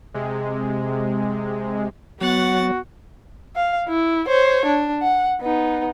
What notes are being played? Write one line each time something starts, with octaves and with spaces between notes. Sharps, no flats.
C3 G#3
F#3 B3 F#4 F#5 A6
F5
E4
C5 C#5
D4
F#5
B3 D#4